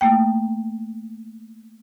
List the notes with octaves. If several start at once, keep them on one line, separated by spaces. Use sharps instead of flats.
A3 A#3 G5